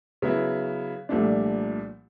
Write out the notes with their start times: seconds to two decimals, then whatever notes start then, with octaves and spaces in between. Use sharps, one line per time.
0.22 C#3 F#3 B3 E4
1.09 C2 A#2 F3 A3 D4